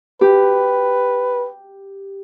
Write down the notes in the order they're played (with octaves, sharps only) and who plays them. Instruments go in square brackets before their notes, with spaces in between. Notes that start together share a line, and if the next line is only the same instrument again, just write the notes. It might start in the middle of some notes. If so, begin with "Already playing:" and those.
[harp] G4 [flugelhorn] B4